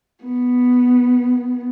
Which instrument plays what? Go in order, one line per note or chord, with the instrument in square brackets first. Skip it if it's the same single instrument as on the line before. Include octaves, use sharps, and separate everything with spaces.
[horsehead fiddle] B3